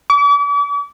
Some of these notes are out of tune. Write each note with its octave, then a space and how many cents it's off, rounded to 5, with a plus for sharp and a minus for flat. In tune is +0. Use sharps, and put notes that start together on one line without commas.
D6 -40